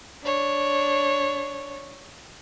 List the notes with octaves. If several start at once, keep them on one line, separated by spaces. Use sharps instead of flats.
D4 C#5